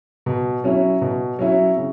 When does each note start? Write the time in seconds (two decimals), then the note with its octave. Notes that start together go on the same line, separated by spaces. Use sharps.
0.26 B2
0.64 F#3 C#4 E4
1.01 B2
1.39 F#3 C#4 E4
1.77 C#3